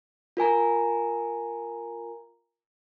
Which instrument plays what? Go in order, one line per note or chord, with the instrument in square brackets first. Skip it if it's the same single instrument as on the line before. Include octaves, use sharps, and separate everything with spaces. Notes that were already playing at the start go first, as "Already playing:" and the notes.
[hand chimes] F4 A#4 G#5 A#5